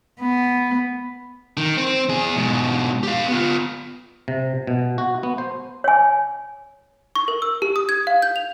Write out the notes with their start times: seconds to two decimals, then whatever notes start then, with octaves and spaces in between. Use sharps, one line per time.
0.20 B3
1.57 D#3
1.77 C4
2.09 E2 G#4
2.36 G#2 B2
3.03 G4 F5
3.28 B3 F4
4.28 C3
4.67 B2
4.98 F#4
5.23 B3
5.38 C5
5.84 C#5 G#5
7.15 C#6
7.28 A#4
7.42 E6
7.62 G4
7.76 D#6
7.89 G#6
8.07 F5
8.22 G6
8.36 F7